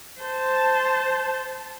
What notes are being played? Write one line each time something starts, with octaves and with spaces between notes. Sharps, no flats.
C5 A5